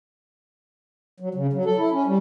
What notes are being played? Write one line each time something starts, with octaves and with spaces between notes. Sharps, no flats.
F#3
C#3
F#3
A4
E4
C#4
G3